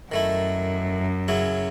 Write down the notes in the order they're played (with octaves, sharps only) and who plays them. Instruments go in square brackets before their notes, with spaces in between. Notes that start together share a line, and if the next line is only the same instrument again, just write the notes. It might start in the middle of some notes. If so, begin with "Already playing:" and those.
[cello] F#2 [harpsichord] D#3 A3 E4
[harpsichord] C#3 F#3 C#4 E4